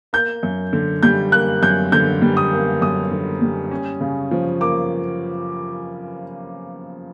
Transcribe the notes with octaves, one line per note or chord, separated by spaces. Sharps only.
A#3 G6
F#2
D3
G3 G6
A#3 F#6
F#2 G6
D3 G6
G3
D#6
A#3
F#2 D#6
D3
G3
C#4
C#3
F3
A#3 D6